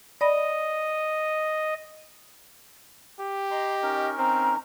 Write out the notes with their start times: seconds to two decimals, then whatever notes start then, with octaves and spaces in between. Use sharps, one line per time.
0.21 D5 D#5 B5 A#6
3.20 G4
3.51 D#5 A#5 C6
3.83 C#4 D#4 A#4
4.18 C4 A#5